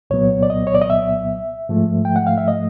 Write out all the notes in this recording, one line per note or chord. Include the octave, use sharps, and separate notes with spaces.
C2 A#2 F#3 B3 C#5
D5
D#5
C#5
D5
D#5
E5
G#2 F3 A3
G5
F#5
F5
E5
D#5